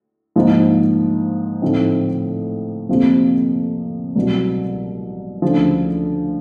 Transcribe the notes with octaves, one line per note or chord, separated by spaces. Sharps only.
G#2 F3 A#3 D#4
A2 F3 A3 C4 D#4
F2 C3 F3 A#3
C2 B2 F#3
D2 C#3 F3